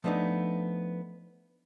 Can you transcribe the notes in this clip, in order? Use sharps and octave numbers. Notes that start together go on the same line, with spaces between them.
F3 A3 B3 D4 D#4